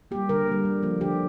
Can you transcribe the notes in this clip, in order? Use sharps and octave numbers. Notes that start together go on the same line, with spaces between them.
G3 A#3 G4
D3 A#4
G3 A#3
D3
F3 A#3
D3 G4